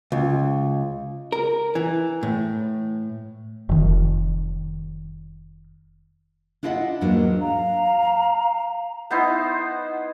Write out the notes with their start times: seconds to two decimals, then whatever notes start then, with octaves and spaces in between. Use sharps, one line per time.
0.12 C#2
1.32 A#4
1.75 E3
2.23 A2
3.69 F1 D#3
6.63 D4 E4 F4 D#5 E5 F#5
7.01 E2 G#2 F#3 A#3 D4
7.40 F5 A#5
9.11 B3 D#4 E4 C5